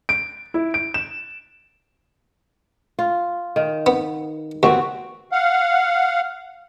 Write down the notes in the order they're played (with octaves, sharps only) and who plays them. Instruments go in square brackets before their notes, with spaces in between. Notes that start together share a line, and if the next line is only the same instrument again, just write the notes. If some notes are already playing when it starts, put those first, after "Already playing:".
[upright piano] D7
E4
D7
E7
[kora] F4
D#3
[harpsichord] B3
[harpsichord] D#2 [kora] B3 C4 F#4
[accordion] F5 F#5